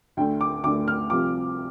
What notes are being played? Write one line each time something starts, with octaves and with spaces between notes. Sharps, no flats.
D2 D3 A3 G5
D6
D2 D3 A3 D6
F6
C2 C3 F3 D6